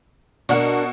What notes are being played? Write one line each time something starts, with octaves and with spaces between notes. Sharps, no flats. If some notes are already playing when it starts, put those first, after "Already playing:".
B2 D4 F#4 A#4 F#5